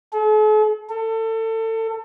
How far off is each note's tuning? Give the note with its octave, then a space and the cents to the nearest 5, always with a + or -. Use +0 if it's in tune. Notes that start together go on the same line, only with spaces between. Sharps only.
A4 -45
A4 +30